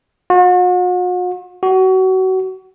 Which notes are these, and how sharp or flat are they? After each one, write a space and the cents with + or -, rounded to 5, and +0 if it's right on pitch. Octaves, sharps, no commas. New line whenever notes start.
F#4 -45
F#4 +25